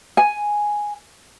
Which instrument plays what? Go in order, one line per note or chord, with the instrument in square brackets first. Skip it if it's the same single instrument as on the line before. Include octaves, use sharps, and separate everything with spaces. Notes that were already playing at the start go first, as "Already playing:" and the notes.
[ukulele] G#5